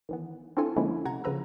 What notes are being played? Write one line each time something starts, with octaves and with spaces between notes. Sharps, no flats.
D#3 E3 B3
C4 D4 E4 F4 A4 G#5
D3 F3 G#3 A#3 C#4 E4
C3 F#5 A#5 G#6
C#3 F3 B4 A#5 E6